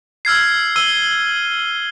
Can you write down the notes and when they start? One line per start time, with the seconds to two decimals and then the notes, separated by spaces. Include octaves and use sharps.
0.25 E6 F6 G#6 C7
0.76 E6 D#7 G7